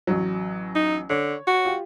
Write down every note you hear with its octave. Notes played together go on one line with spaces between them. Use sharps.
A1 F#3
D#4
D3 C#5
F#4
F4 G4